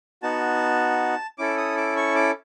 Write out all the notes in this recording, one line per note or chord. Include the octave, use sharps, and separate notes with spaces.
B3 D#4 F#4 A5
C#4 E4 A4 D6
D#6
D6
C#6
D6